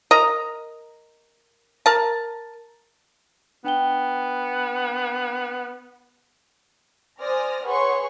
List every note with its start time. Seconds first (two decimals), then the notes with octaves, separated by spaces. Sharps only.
0.11 A#4 D#5 A#5
1.86 A#4 A5
3.64 B3 D4 G5 G7
7.20 C5 D5 G#5 D#6 F6 A#6
7.66 G#4 B4 C#5 F#5 C6 C#6